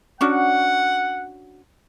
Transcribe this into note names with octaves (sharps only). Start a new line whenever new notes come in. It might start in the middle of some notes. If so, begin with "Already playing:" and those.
C#4 D4 F#4 F#5